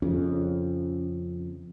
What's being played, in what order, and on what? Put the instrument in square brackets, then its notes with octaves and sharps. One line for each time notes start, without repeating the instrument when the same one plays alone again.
[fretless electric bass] F2 C#3 [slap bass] C#4